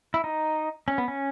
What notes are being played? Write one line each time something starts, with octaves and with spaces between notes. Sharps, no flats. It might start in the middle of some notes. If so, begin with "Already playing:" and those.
E4
D#4
C#4
B3
C#4